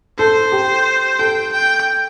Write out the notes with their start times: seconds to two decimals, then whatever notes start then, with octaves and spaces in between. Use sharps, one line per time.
0.19 A4 C5
0.52 G4
1.19 A4 G5
1.53 G5